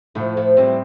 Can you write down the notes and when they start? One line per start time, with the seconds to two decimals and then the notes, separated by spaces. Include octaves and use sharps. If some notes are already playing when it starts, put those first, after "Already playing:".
0.15 A2 F3 A3
0.37 F3 A3
0.57 E3 G3 C4